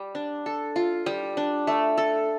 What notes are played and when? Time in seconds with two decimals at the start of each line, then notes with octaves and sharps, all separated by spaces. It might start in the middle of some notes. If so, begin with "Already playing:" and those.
Already playing: G3
0.15 D4
0.46 A4
0.76 F4
1.06 G3
1.37 D4
1.67 A3
1.98 A4